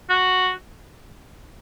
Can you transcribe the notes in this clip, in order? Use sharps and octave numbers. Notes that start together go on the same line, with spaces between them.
F#4